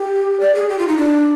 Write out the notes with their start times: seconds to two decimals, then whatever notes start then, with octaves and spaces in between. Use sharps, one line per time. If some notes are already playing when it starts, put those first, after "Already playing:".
Already playing: G4
0.40 D5
0.55 G#4
0.69 G4
0.78 F4
0.88 D#4
0.98 D4